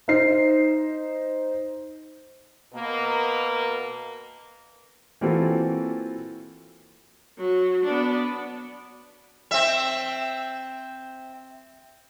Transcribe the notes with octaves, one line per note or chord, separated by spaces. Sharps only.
D#4 C5 C7
B2 A#3
E3 A#3 C4 F4 F#4 A4
F#3
B3 D4
C4 E5